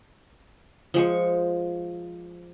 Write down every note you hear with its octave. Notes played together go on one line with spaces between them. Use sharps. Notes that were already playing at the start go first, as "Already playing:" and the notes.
F3 G#3 C#6